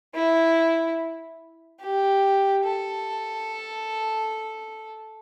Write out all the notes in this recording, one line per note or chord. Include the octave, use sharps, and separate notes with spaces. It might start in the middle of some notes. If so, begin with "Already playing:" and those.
E4
G4
A4